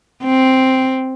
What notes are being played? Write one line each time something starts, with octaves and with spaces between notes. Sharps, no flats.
C4